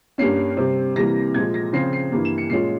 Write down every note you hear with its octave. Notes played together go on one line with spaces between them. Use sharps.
G2 G3 A#3 C#4 C7
C3 G3 C4
C3 E3 G3 A#3 A#6
A#2 F3 G#3 G#6
A#6
C#3 F3 C4 F4 C7
C7
G2 E3 G3 A#3
E7
C#7
A#2 G#3 C#4 F4 C7